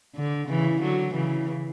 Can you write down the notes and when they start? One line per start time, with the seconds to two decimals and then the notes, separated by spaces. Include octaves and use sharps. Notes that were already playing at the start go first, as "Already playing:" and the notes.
0.16 D3
0.49 C#3 E3
0.81 D3 F#3
1.14 C#3 E3